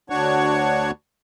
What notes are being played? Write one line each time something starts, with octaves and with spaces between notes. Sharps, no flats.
D2 D4 F#4 C#5 C#6